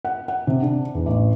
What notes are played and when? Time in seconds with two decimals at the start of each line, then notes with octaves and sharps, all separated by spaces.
0.05 F#5
0.28 F#5
0.47 C3
0.62 D4
0.95 E2
1.06 A1